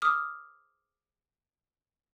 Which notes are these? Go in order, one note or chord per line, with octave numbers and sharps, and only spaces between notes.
D6 D#6 F6